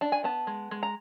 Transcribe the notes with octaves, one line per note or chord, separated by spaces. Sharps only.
D4 A5
G#5
B3 A5
G#3
G#3
A#5